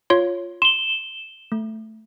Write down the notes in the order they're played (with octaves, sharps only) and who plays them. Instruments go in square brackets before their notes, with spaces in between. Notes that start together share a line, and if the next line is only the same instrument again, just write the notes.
[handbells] F4 C#5 C6
[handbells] C6 [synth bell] E7 G7
[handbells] A3